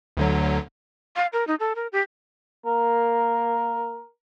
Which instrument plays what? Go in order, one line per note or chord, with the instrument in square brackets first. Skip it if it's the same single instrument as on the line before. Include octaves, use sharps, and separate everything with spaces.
[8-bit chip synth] D2 D3 F#3
[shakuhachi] F5
A#4
D#4
A4
A#4
G4
[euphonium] A#3 [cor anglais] A#4